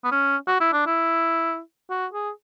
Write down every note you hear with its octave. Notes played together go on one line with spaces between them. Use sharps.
B3
C#4
F#4
E4
D4
E4
F#4
G#4